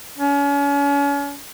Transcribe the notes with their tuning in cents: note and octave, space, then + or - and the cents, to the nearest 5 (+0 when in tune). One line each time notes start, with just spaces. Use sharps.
C#4 +40